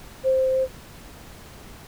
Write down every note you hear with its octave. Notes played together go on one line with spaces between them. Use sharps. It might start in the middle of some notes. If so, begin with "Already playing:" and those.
C5